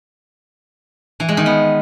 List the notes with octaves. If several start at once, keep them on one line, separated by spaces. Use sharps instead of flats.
E3
G#3
D#3
B3